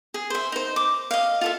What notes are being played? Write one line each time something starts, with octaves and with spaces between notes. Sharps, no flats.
G#4
C5 E5
D#4 C5
D6
D#5 F5
F4 A4 E5